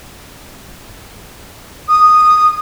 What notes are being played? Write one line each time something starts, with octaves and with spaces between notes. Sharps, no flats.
D#6